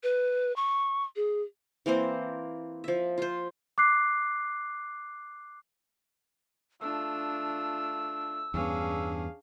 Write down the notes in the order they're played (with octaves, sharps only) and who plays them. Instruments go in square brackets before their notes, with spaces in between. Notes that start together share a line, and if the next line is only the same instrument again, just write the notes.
[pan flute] B4
C#6
G#4
[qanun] E3 A#3 C4 C5
F3 E5
F4 C5
[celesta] D6 F#6 C7
[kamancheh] A3 [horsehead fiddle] D4 F4 [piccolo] E6
[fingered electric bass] E2 G2 B3 [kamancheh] C#4 D4 [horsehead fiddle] G#4 F5